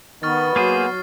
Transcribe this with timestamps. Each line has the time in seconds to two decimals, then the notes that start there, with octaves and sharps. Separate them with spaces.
0.23 D#3 B3 C#6 F6 A6
0.56 F#3 A#3 G#4 C5 C7